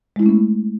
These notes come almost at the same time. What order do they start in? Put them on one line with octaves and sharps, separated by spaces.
G#3 E4 A3 C#4 B3